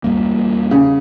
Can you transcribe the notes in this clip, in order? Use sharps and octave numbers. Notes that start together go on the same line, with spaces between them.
E2 G3 A#3
C#3